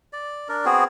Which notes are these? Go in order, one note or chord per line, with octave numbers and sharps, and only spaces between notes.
D5
D4 A#4
B3 C4 F#4 G#4